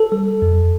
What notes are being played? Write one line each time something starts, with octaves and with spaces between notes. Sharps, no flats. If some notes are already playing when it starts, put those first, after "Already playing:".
Already playing: A4
G3
F2